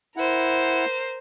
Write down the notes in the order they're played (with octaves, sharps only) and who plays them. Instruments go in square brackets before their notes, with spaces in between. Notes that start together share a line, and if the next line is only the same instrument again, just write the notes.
[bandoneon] E4 F#5 [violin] A#4 C5